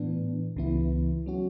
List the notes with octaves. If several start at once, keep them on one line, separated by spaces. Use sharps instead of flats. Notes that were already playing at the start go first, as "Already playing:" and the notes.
Already playing: A2 E3 B3 D4
C#2 C#3 E3 B3 E4
F#3 C#4 F#4